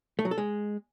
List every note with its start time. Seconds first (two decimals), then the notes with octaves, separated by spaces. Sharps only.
0.19 A3
0.25 F#3
0.31 A4
0.38 G#3